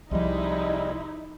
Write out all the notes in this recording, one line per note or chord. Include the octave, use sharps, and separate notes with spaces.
C2 C3 F3 G3 G#3 D#4 E4